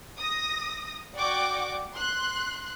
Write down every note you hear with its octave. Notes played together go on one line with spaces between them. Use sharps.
D#6 A#6
F#4 D5 F#5 G5 C#6 D6
C6 F#6